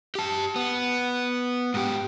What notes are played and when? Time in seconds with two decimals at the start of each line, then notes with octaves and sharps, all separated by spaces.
0.15 G4 A5
0.56 B3
1.74 G#2 G4